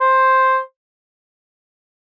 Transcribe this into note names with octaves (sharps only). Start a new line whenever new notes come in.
C5